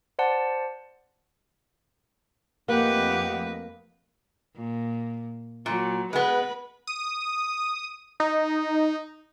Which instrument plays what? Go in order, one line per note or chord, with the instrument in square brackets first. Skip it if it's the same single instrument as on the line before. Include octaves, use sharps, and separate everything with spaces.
[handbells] C5 D5 F#5 A5
[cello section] F2 A3 D#5 [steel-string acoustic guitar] A#3 [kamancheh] G4 F#5 [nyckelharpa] B4
[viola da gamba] A#2
[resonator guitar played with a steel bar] A#2 [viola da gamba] F#3
[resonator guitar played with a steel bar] G#3 B3 [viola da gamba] B4
[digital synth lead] D#6
D#4